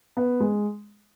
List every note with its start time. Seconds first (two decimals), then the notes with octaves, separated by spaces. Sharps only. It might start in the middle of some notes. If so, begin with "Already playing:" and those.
0.17 B3
0.40 G#3